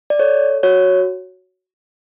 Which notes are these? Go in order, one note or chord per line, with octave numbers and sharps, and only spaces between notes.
D5
A4 C#5
F#4 C#5